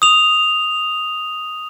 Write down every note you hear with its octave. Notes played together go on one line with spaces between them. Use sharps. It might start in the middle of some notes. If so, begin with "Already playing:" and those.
D#6 F7